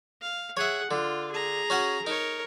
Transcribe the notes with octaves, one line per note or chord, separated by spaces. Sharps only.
F5
G#4 C#5 E5 F#5
D3 F4
G#4 A#5
C#4 F#4 F#5
D#4 A#4 C#5